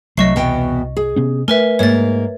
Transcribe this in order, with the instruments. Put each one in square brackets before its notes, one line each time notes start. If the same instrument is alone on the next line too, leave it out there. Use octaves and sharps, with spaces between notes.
[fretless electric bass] C2 [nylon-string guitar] F#3 A3 [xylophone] D#5 C#6 C7
[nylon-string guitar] E2 B2 G5
G#4
[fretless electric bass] C3 B3 C#4
[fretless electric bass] A3 [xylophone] A#4 B4 E5 [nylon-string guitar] G#5
[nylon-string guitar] G#2 A#3 [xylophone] C#5 A6